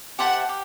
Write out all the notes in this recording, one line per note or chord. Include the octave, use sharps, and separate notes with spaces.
G4 C5 E5 F#5 A5
G4